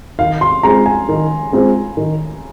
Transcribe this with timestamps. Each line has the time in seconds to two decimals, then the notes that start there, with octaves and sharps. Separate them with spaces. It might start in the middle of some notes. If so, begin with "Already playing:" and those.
0.19 D#3 F5
0.41 C6
0.63 G#3 C4 F4 A#5
0.86 G#5
1.09 D#3
1.52 G#3 C4 F4
1.97 D#3